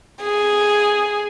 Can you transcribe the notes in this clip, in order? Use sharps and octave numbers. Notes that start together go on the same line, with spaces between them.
G#4